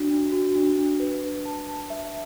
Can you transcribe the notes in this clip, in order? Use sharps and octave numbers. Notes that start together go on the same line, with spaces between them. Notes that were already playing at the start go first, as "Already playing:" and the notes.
Already playing: D4 F#4
D4
F#4
D4
D4
B4
B4
A5
A5
E5